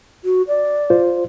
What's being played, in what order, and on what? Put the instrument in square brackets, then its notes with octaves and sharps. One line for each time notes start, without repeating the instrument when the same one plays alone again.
[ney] F#4
D5
[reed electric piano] F4 C5